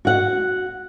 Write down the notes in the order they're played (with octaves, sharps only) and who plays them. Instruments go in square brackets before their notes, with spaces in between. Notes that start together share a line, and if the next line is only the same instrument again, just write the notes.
[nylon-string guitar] F#4 F#5